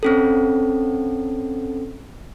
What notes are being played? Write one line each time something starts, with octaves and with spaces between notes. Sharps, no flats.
C4 C#4 A4